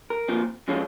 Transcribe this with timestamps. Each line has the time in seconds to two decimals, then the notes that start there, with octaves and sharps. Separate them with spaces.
0.10 A#4
0.28 A#2 F3 C4
0.68 C3 F3 G#3 C#4 F4